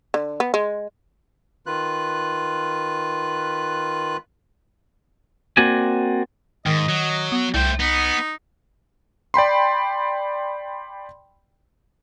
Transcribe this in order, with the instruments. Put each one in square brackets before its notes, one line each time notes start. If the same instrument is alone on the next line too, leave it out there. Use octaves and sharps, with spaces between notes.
[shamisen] D3
B3
G#3
[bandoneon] D#3 F4 B4 F#6
[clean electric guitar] A#3 C4 F#4 D5 G#5
[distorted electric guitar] G#2 [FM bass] D#3 [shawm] D#5
[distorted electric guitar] F#3
[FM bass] B3
[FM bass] C2 [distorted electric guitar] A3 C5 [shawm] G5
[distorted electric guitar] B3 [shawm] D#4
[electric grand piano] D5 G5 B5 C6